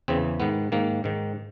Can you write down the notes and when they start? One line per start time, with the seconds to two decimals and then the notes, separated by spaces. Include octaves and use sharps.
0.08 E2 C#3 E3 C4
0.40 G#2 D#3 B3
0.72 G#2 D#3 A#3
1.04 G#2 D#3